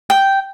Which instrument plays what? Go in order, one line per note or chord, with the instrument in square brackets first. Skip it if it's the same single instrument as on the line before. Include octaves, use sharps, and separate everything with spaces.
[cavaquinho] G5